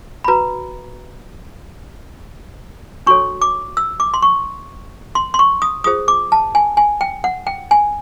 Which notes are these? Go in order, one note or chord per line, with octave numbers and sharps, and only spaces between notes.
B5
F#4 B4 A#5
D4 F#4 A4 C#5 C#6
D6
E6
D6
C6
C#6
C6
C6
C#6
D#6
F4 G#4 C5 D#6
D6
A5
G#5
G#5
G5
F#5
G5
G#5